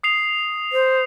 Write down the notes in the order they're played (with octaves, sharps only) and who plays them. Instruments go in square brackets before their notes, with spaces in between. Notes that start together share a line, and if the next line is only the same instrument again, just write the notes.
[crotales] D#6 C7 F7
[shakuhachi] C5